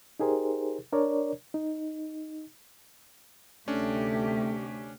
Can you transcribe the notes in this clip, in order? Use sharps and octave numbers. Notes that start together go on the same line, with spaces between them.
D#4 G4 G#4 A#4 C5
D4 A#4 C#5 D5
D#4
D2 C3 A3 C#4 D4 G4